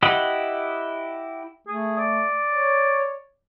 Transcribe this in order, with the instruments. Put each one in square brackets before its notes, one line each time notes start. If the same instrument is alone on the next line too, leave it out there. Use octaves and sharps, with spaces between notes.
[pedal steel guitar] E4 G4 D#5 F#5
[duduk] A3 [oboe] G#4
[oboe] D5
[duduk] C#5